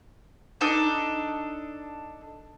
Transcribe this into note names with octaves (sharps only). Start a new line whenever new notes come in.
D4 D#4 A4